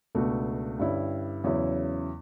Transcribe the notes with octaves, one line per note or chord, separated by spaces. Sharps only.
C#2 B2 A3 D4 F#4
G2 D3 G3 C#4 E4
E2 C#3 F#3 C#4 E4